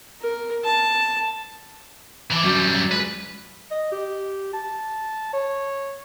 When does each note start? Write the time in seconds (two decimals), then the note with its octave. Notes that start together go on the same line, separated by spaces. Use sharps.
0.21 A#4
0.64 A5
2.31 E3 E4 E5 A5 D6
2.43 F#2 D3 F#3 G3 D4
2.92 G#3 F4 B4
3.71 D#5
3.92 G4
4.53 A5
5.33 C#5